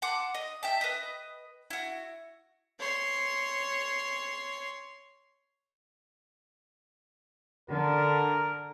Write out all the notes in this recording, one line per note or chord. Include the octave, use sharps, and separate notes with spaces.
F#5 A5 C6 D6
D#5
E5 G5 A5
B4 D#5
E4 F#4
C#5 C6
D3 A#4